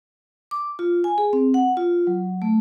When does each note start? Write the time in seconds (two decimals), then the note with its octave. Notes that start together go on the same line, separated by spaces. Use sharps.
0.51 D6
0.79 F4
1.04 G#5
1.18 G#4
1.33 C4
1.54 F#5
1.77 F4
2.07 F#3
2.42 A3